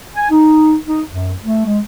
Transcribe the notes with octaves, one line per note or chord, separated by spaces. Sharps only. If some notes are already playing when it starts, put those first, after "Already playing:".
G#5
D#4
D#4
F#2
A3
G#3